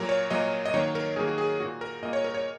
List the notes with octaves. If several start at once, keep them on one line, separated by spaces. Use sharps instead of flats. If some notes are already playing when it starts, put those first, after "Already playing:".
Already playing: A#2 F#3 A#3 A#4
C#5
A#2 F#3 A#3 D#5
D#5
D#3 F#3 A#3 C#5
A#4
D#3 F#3 A#3 G#4
F#4
G#4
A#2 A#3 F#4
A#4
A#2 A#3 D#5
C#5
A#4
C#5